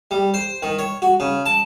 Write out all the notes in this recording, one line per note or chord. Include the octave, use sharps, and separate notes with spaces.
G3
C5
D#3
C#5
F#4
C#3
A5